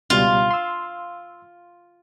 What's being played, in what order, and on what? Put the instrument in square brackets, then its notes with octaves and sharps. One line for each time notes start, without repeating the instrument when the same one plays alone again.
[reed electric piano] C#2 B2 G3 [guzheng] F4
[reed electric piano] C6 E6